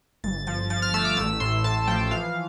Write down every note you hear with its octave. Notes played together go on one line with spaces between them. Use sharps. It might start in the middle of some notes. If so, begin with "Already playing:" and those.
G1 A6
F3 A6
F3 A6
F6
A3 E6
D6
A1 E6
A2 C6
A2 A5
F3 G5
E3 F5